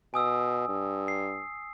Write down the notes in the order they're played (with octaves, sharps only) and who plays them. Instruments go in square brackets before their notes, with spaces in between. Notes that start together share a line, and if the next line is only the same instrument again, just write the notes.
[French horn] B2 [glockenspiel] G#5 D#6 E6
[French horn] G2
[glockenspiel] C7